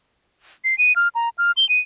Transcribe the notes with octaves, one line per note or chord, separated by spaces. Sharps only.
C7
D#7
F6
A#5
F6
G7
D#7